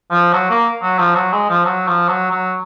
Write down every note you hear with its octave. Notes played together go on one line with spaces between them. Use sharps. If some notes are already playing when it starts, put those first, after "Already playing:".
F3
F#3
A#3
F#3
F3
F#3
G#3
F3
F#3
F3
F#3
F#3